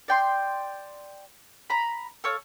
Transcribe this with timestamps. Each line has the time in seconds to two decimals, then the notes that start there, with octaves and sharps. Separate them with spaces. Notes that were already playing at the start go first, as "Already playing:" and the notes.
0.08 D5 G5 C6
1.70 A#5 B5
2.24 A4 C#5 F5